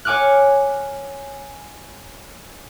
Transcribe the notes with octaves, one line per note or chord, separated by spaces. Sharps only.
C#5 F#5 G#5 D6 F6 F#6